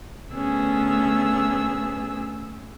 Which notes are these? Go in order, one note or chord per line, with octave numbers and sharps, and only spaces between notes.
D2 A3 B3 C#4 G#4 E6